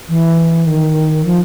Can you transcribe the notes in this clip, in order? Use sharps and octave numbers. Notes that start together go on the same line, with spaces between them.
E3
D#3
F3